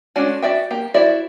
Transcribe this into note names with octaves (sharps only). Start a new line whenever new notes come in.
G#3 A3 C#4 D4 F#4
F#4 D5 E5 G5
A#3 G4 G5
E4 F#4 C5 D5 E5